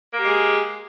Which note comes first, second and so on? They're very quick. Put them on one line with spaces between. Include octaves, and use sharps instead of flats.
A#3 G4 G#3 G#4